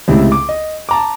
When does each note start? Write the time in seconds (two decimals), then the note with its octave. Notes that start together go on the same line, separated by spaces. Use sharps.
0.08 C#2 A2 C3 E4
0.32 D6
0.49 D#5
0.89 A5 A#5 D6